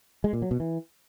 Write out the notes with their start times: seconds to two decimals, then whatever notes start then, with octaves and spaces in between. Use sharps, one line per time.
0.24 G#3
0.33 A#2
0.42 F#3
0.51 B2
0.60 E3